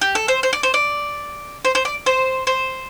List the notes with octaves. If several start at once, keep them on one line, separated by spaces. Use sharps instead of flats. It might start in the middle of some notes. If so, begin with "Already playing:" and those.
G4
A4
C5
C5
D5
C5
D5
C5
C5
D5
C5
C5